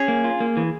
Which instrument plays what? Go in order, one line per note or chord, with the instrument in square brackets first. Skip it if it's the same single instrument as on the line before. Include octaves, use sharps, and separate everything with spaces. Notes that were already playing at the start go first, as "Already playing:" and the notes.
Already playing: [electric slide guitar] C#4 [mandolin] G#4
[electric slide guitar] A#3
F4
A#3
E3